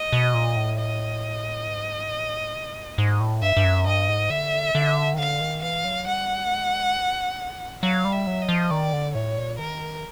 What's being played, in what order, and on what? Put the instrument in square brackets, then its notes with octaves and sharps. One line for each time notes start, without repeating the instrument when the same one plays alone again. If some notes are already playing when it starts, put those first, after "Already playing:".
Already playing: [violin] D#5
[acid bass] B2
A#2
A2
[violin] D#5
[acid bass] G#2
A2
B2
G2
G#2
A2
[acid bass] G2 [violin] E5
[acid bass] G2
F#2
[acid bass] G2 [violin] D#5
[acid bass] G#2
[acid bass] D3 [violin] E5
[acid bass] D3
D#3
[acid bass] D3 [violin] F5
[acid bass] D#3
[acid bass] E3 [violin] F5
[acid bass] F#3
[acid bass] G3 [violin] F#5
[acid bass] A3
G#3
[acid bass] F#3 [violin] F5
[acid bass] G3
[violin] E5
[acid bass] F#3
[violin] D#5
[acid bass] F3
[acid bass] D#3 [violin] D5
[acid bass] D3
[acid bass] A2 [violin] C#5
[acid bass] A#2
[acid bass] D#3 [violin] A#4